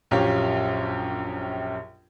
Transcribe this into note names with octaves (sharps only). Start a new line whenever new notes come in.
A#1 F#2 F4 G4 C#5